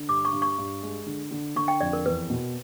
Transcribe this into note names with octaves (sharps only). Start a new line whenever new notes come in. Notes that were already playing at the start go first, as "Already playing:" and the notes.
Already playing: D3
G2 D6
C#6
G2
C#6
G2
G#3
D3
D3
D3 C#6
G5
F2 D5
A#4
E2 B4
B2